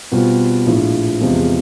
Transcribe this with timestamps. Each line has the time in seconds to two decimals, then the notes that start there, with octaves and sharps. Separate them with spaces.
0.12 B2 G3 C4 F4
0.66 A#1 A2 F3
1.21 E2 C3 F3 G#3